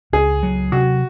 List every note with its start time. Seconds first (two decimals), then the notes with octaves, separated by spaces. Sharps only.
0.13 C#2 G#4
0.43 F#3
0.72 C3 F#4